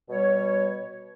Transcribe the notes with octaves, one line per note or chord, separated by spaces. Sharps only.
B2 G3 C#5